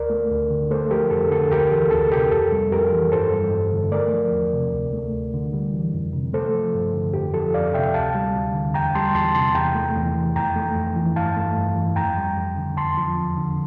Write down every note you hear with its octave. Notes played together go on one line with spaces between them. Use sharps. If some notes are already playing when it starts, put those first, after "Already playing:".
Already playing: D2 A#4 D5
A3
D2
D3
A3 A4 C5
F3 G4 A#4
F2 A4
D3 A4
D2 G4 A#4
E3 A4
D2 A4
C3 G4 A#4
F2 A4
G3
F2 G4 A#4
E3
G2 A4 C5
G3
G2
D3
A3 A#4 D5
F3
E2
C3
D2
A3
D2
D3
G3
E3
F2
C3
A3 A4 C5
F3
G2
D3
F2 G4
F3 A4
F2 D5 F5
C3 E5 G5
D2 F5 A5
G3
D2
D3
E2 G5 A#5
G3 A5 C6
E2 A5 C6
C3 A5 C6
E2 G5 A#5
A3
E2
E3
F2 G5 A#5
A3
F2
E3
G2 F5 A5
A3
G2
E3
F2 G5 A#5
G3
F2
D3
E2 A5 C6
F3
E2
D3